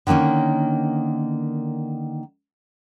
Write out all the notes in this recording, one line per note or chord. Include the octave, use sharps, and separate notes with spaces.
D3 D#3 A#3 C#4 D#4